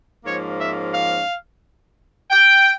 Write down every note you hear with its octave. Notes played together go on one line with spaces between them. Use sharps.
G#2 F3 A#3 C#4 C#5
E5
F5
G5